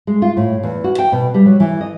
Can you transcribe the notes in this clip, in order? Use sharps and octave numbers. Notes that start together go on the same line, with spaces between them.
G#3
F4
A2
E2
F#4
G5
B2
G3
F#3
E3
D#5